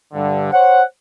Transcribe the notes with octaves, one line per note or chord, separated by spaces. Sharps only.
G2 D3
C5 C#5 F#5